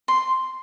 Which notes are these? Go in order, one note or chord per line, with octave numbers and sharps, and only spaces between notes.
C6